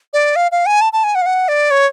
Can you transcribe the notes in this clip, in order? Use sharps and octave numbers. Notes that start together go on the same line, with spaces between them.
D5
F5
F5
G#5
A5
A5
G#5
F#5
F5
F#5
D5
C#5